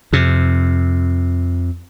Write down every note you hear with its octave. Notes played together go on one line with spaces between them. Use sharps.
F2 C3